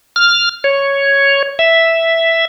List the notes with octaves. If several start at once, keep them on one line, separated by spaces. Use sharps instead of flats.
F6
C#5
E5